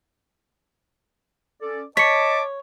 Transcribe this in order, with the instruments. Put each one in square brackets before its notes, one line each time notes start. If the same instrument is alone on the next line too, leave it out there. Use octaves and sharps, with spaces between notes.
[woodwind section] C#4 A4 D5
[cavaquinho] C#5 [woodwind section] D#5 A5 [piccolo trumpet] D6 [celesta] B6 C#7